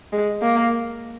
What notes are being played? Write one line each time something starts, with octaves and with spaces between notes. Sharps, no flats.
G#3
A#3